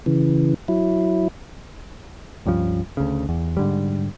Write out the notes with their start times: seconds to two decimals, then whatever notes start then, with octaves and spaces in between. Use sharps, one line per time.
0.06 C#3 E3
0.68 F#3 E4
2.46 C#2 G2 C#3 F3
2.97 D2 C#3
3.29 E2
3.57 G#2 D3 G3